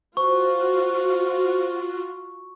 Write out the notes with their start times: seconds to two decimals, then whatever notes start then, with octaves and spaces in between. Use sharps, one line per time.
0.17 F4 F#4 C5 C#6